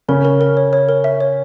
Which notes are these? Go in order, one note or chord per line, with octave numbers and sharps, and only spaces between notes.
C#3 C#4 A#4
A#4
A#4
C#5
C#5
A#4
E5
C#5